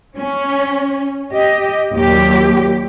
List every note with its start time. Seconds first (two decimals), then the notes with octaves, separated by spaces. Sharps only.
0.16 C#4
1.33 G4 D#5
1.93 D#2 A#2 F#3 G4